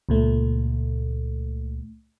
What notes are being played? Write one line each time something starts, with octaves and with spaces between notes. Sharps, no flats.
C#2 A#2 A3